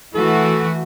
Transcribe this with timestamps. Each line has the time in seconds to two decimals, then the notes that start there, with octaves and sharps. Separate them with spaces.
0.15 E3 A3 F#4 A4